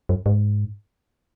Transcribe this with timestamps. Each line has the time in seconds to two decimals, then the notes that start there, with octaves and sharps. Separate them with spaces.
0.09 F#2
0.26 G#2